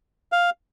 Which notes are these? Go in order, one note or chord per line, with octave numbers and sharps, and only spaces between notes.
F5